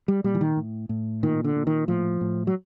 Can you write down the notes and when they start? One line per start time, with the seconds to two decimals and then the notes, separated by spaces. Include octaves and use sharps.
0.08 G3
0.24 A#2 G3
0.35 E3
0.41 D#3
0.56 A2
0.89 A2
1.23 A#2 D#3
1.44 D3
1.56 A#2
1.67 D#3
1.88 A2 F3
2.21 A2
2.47 F#3